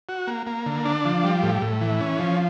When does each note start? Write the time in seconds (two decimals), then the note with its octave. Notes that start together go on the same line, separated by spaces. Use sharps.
0.09 F#4
0.27 A#3
0.47 A#3
0.66 D3
0.85 D4
1.05 F3
1.24 G3
1.43 A2
1.62 A2
1.81 E3
2.01 C#4
2.19 F3